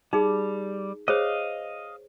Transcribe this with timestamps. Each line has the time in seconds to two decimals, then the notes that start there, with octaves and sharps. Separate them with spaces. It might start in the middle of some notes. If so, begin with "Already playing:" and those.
0.13 G3 D#4 G#4
1.08 G#4 C5 C#5 D#5 F5